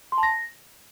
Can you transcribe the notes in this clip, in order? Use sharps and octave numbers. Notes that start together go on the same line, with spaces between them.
C6
A5
A#6